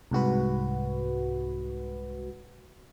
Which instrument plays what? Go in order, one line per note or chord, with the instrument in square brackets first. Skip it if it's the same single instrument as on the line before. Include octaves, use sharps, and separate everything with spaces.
[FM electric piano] C2 G#2 F#4 B4